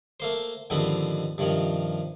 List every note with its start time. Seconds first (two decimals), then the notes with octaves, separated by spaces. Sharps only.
0.20 A3 A#3 C5
0.70 D#2 G#2 D3 F3 B3 C4
1.38 G2 C3 D#3 F3